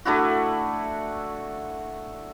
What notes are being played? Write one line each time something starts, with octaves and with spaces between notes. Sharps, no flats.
A3 D4 E4 F#4